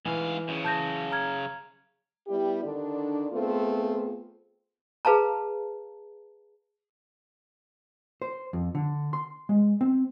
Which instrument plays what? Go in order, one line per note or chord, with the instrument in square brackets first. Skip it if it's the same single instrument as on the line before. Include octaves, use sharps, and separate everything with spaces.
[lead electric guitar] G#2 F5 [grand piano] E3 [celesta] G#5
[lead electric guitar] F#2 C#3
[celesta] A5 G6 A#6
A#5 F6 G#6
[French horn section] G3 B3 E4 G4
D3 D#3 D4
A3 B3 C4 F4 G#4
[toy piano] G#4 B4 F5 A5 A#5
[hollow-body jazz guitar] C5
F2
D3
C6
G#3
C4